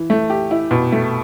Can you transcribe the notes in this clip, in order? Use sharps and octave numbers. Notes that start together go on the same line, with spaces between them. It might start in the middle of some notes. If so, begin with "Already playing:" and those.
Already playing: E3
A3
G4
E4
B2
A3